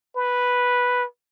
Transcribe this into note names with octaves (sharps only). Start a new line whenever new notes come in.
B4